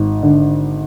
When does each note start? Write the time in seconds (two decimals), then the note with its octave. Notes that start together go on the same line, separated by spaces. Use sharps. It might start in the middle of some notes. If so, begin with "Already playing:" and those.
Already playing: G#1
0.23 D3